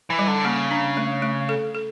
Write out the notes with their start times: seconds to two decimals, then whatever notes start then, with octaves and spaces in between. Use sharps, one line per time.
0.10 E3
0.19 G3
0.28 D3
0.45 C#3 A#3
0.71 D4
0.97 A3
1.22 A3
1.49 A4
1.74 A4